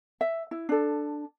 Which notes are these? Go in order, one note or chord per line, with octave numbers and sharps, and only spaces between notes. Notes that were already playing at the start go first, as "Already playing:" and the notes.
E5
E4
D4 A4